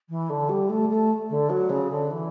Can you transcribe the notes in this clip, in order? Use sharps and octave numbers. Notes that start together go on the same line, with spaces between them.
E3
D3
G3
A3
A3
D3
F#3
C#3
D3
E3